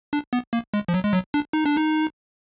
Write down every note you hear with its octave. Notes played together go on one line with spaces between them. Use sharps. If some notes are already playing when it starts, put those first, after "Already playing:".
D4
B3
A#3
G#3
F3
F#3
G#3
F#3
D4
D#4
D4
D#4